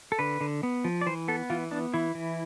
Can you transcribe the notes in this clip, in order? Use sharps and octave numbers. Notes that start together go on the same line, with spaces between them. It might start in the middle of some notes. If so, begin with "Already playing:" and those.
A4
D3 B4
D3
B3
F3
D5
E3 C5
B3 A4
E3 F4
B3 D4
E3 E4
E3